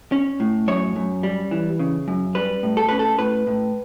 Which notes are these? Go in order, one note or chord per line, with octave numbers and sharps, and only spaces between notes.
C#4
A2
F#2 C#5
F#2
G3
E3
C#3
F#2
G3 B4
A2
A4
C#4 B4
A4
A2 B4
A2